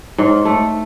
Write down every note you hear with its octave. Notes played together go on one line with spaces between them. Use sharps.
G#2
A3